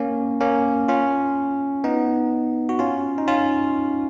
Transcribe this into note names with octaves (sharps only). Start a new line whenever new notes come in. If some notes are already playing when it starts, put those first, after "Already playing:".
Already playing: A#3 C#4
A#3 C#4
C#4 F4
B3 D#4
F#4
C#4 F4
D#4
C#4 F4